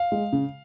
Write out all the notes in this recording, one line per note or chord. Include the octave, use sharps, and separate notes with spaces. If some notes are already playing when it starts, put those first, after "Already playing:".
Already playing: F5
G#3
C#3